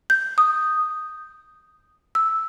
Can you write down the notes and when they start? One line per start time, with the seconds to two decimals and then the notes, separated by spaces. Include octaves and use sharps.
0.10 G6
0.38 D#6
2.15 E6